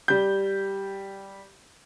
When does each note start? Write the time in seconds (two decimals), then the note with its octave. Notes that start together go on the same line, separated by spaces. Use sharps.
0.08 G3 G6